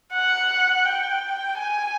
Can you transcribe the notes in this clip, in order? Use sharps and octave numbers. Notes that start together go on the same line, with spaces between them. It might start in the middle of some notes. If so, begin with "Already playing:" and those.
F#5
G5
G#5